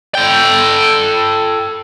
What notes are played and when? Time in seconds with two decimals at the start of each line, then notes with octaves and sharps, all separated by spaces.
0.15 A4 G5